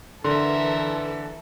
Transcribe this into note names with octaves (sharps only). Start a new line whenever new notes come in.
D3 E3 A4 A#4 E5 C6